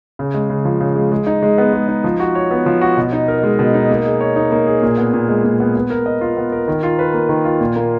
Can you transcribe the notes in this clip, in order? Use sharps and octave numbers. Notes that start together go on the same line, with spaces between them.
C#3
G#3
C#3
F3
C#3
G#3
G#3
D#4
G#3
B3
G#3
D#4
F3
F#4
C#5
B3
F3
F#4
B2
D#4
A#4
G#3
B2
D#4
A#3
G#4
C#5
D#4
A#3
G#4
A#2
B3
A#2
G#3
A#2
B3
B3
A#4
D#5
F4
B3
A#4
D#3
F4
B4
A#3
D#3
F4
A#2
A#3